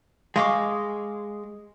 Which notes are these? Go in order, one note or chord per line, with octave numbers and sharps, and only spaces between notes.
G#3 F5 C#6 D6